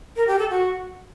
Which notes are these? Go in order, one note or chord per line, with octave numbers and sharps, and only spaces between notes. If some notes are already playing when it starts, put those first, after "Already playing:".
A#4
G4
A4
F#4